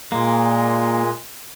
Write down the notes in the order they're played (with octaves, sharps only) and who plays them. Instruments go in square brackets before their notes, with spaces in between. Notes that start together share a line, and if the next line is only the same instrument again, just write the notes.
[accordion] A#2 G#3 [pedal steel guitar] A#3